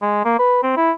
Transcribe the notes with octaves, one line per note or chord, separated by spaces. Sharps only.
G#3
A#3
B4
C4
E4